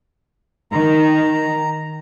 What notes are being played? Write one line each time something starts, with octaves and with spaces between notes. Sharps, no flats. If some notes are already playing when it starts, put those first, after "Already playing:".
D#3 A#5